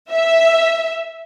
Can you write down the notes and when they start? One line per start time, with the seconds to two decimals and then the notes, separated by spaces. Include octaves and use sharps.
0.11 E5